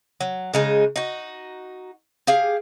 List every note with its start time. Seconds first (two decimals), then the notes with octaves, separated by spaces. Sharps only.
0.21 F#3
0.54 C#3 G#3 D#4
0.96 D#4 F#4
2.27 G4 G#4 F5